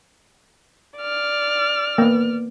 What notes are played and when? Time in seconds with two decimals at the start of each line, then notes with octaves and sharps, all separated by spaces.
0.97 D5 F6
1.98 A#3 B3